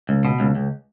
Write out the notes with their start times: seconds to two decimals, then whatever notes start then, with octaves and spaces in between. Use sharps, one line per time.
0.09 C#2
0.25 B2
0.40 C#2
0.55 C#2